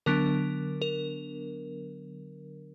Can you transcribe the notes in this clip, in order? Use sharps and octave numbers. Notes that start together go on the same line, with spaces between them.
D3 F#3 B3 D4 A#4
A#4